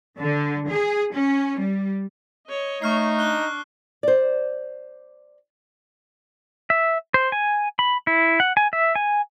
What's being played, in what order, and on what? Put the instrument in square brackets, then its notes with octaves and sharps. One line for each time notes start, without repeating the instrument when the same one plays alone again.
[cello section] D3
G#4
C#4
G3
[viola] C#5 D#5
[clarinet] A3 [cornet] D#4 [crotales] C#6 F6 C7
[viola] D4 [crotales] F#6 G7
[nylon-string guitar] C5 D5
[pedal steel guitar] E5
C5
G#5
B5
E4
F#5
G#5
E5
G#5